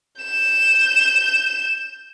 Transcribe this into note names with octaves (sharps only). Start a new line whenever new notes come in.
G6 E7